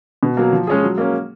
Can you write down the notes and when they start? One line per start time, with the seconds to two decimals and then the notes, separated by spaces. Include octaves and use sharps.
0.23 B2
0.37 F#3 A#3
0.53 F3
0.67 G#3 C#4 G#4
0.83 F#3
0.98 A#3 C#4